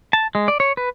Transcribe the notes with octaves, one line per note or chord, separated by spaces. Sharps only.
A5
G#3
D5
C#5
B4